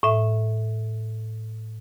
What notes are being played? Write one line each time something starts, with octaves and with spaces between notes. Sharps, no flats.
A2 E5